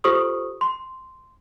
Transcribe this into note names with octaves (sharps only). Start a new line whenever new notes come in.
F4 G4 A4 C5 C#6 D#6
C6